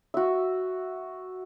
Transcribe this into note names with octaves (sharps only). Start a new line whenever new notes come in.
F#4 E5